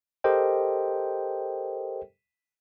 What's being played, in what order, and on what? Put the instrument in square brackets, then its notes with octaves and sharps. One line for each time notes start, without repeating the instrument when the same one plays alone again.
[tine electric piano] G4 A4 A#4 C5 D#5 G5